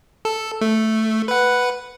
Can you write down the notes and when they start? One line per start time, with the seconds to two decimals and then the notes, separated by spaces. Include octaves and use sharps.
0.25 A4
0.61 A3
1.28 B4 F#5